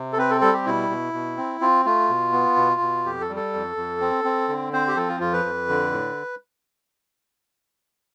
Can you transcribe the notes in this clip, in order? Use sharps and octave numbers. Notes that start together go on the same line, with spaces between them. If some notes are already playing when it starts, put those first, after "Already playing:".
Already playing: C3
A4
C4 B4
A4
G3 A4
G4
B2 E4
B2
B2
C4
C4 F4
A3 F4
B2
B3
B2
B2
F2 G4
A4
G3
A4
F2
F2
C4
C4
D3
C4 C5
G4
F3 A4
F4
F2 F4
B4
F2
D3
A2